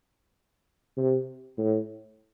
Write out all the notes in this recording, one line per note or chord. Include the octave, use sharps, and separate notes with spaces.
C3
A2